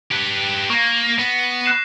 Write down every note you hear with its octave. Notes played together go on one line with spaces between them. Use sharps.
G4 B4
A#3 C#6 A#6
B3
F#6 C7 E7